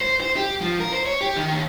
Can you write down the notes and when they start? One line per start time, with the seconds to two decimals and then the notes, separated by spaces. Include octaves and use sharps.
0.01 C5
0.21 C5
0.36 G4
0.61 F3
0.80 A#4
0.93 C5
1.06 C#5
1.21 G4
1.37 D#3
1.52 D#2